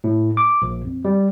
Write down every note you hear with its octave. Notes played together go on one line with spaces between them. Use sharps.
A2
D6
A#1
F2
G3